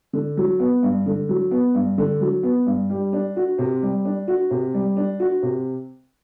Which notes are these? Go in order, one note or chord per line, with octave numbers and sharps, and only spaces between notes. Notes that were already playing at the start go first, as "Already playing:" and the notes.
D3
F#3
B3
G2
D3
F#3
B3
G2
D3
F#3
B3
G2
G3
D4
F#4
C3
G3
D4
F#4
C3
G3
D4
F#4
C3